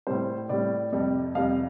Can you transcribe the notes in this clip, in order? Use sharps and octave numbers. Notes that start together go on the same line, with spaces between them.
A2 G3 C5
A2 G3 D5
F2 C3 G3
F2 C3 G3 F5